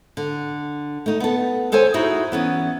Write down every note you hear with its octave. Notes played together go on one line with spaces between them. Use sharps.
D3
A3 D#4
B3 A4
D#2 A4 C5 C#5 G#5
D#4 E4 F#4 G#4
E3 B3 C#4